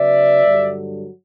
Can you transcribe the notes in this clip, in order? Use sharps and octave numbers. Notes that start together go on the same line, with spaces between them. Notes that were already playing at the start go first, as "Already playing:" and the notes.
Already playing: C#3 F#3 B3 D5 E5
G2 D3 F#3